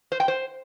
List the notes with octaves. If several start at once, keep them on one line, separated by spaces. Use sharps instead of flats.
C5
G5
C5